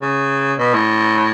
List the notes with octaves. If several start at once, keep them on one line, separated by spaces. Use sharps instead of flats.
C#3
B2
A2